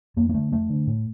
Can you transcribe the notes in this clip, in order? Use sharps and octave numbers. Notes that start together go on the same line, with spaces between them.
F2 A#3
A#3
D3 A3
F2 A3
D3
A2